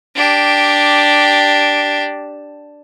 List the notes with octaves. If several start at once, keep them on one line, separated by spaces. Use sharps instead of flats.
D4 G4